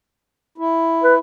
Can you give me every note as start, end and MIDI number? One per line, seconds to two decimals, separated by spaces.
0.58 1.19 64
1.04 1.14 71